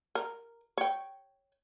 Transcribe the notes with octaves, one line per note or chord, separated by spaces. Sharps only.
A#4
C#5 G5